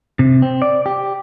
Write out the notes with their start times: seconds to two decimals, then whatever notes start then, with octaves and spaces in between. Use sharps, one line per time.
0.19 C3
0.42 C4
0.62 D5
0.86 G4